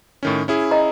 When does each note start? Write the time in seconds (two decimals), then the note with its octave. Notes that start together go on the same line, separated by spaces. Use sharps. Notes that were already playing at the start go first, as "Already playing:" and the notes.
0.23 A2 D#3 C#4
0.48 C#4 E4 G#4
0.71 D#5 A#5 D#6